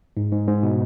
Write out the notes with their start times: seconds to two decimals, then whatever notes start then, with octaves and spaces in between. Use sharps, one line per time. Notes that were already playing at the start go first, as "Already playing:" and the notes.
0.17 G#2
0.32 G#2
0.47 G#2
0.63 B2